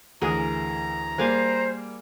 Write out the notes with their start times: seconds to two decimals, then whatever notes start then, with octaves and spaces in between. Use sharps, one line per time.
0.22 D2 E3 G#4 A#4 A#5 D#6
1.18 G3 A#3 G#4 C5 F5 G#5